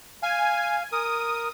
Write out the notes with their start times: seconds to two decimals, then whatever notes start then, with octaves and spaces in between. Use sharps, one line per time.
0.23 F5 G#5
0.92 A#4 D#6